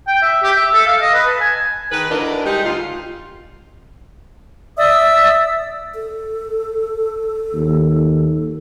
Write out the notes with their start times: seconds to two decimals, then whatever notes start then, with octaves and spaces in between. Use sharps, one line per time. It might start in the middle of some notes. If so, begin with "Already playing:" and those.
0.07 G5
0.22 E5
0.43 G4
0.56 E5
0.74 A4
0.87 F5
1.02 D#5
1.14 B4
1.27 A5
1.41 G#5
1.91 D#3 G#4 B4
2.09 D2 E3 D4 A#4 D#5
2.45 G3 G#3 D#4 G4 G#4
2.65 D2 F4
4.78 D5 E5 D#6 E6
5.95 A4
7.54 D#2